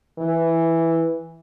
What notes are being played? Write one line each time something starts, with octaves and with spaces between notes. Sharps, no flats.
E3